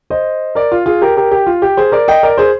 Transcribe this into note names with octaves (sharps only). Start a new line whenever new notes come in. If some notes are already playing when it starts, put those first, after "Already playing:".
C5 D#5
A#4 D5
F4
F4 G#4
G4 A#4
G4 A#4
G4
F4
G4
G#4 C5
A#4 D5
D#5 G5
A#4 D5
G#4 C5